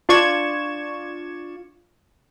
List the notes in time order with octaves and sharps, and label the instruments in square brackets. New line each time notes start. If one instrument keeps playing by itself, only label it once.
[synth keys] D4 F4 D5 C#6 G#6 E7